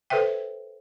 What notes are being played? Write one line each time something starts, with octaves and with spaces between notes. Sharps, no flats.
A4 B4 C5 E5 G5